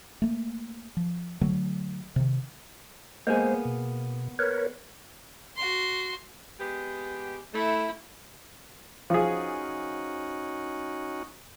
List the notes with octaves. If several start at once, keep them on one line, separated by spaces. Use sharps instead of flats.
A3 A#3
F3
D3 F#3 A3
C3 D#3
G#3 A#3 B3 G#4 C5
B2
A#4 B4 C#5
F#4 C6
G#3 B3 G4
A3 E4
F3 C#4 D#4 F#4 G#4